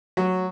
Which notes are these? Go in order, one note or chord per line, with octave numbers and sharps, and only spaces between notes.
F#3